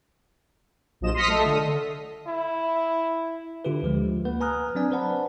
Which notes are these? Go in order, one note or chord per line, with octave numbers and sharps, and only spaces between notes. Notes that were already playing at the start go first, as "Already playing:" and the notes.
A#1 A#2 F3 F#3 D#5 E7
C6 D#6 F6 A#6 B6 C#7
A3 A4 D#5 E5
D3 D#6
E4
D3 F4 G4 B4
D2 F3 G#3
A#3 B4 F#5
B4 G#5 A#5 D#6 F6 F#6
F#3 C4 D4 D5 G#5
B4 C5 D5 F#5 A5 B5